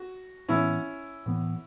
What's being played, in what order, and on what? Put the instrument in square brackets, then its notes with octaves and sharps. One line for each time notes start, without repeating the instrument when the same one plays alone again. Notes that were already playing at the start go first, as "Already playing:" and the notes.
Already playing: [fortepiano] F#4
[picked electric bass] A2 E3 B3 [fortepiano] C#4 E4
[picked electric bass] A2 E3 B3